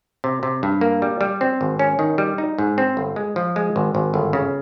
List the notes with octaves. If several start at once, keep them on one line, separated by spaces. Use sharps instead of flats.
C3
C3
G2
A#3
G3
G3
C4
G#1
C#4
D#3
G3
D#4
G#2
C4
G1
G#3
F3
G#3
G#1
G#1
G1
C#3